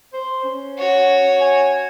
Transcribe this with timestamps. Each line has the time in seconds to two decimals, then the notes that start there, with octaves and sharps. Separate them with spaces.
0.13 C5
0.44 C#4
0.78 F#4 C#5
1.41 G#5